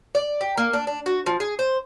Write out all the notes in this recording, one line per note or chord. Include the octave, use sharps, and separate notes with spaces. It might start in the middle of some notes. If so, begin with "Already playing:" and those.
D5
G4
A#3
D4
D4
F#4
F3
G#4
C5